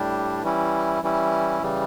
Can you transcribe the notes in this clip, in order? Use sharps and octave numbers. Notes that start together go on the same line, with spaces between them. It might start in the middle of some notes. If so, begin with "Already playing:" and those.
Already playing: A2 G3 D4 G4
E3 G3 C#4 E4
E3 G3 C#4 E4
C#3 E3 G3